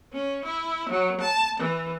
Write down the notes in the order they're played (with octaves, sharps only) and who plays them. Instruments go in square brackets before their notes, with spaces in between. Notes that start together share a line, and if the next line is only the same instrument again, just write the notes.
[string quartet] C#4
E4
F#3
A5
E3